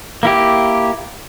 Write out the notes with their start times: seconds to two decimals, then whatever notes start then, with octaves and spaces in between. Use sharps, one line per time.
0.23 A#3 E4 G4